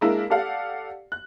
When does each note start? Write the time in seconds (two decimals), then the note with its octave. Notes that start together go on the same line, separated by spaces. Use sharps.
0.01 G#3 A#3 D4 E4 A#4
0.30 G4 A4 D5 F5 F#5
1.12 F#6